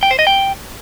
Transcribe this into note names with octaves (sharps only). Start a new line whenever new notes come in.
G5
C5
D#5
G5